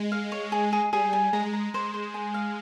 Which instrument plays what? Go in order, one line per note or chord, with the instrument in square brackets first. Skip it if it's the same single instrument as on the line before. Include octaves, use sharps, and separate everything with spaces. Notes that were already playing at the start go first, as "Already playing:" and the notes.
Already playing: [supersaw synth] G#3
[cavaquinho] F5
C#5
G#4
G#4
[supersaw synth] G3 [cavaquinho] G#4
[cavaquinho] G#5
[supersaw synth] G#3 [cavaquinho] A#5
[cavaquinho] A#5
[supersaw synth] G#3 [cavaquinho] C5
[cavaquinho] C5
G#5
F5